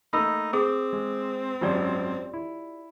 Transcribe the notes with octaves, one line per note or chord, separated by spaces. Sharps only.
A3 A#3 D#4 B5 E6
C4 G#4 D6 D#6
G#3
G#1 F#2 F4 G4 D5
E4